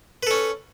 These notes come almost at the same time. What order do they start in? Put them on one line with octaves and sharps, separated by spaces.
B4 A4 C#4